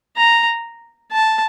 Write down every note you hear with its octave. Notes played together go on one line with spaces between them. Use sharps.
A#5
A5